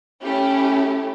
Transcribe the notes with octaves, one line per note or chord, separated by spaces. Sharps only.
A3 C#4 E4 G4